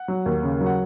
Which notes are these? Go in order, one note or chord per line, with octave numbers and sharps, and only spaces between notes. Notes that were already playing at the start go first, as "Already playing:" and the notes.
Already playing: F#5
F#3
D#2
C#3
F#3
F#5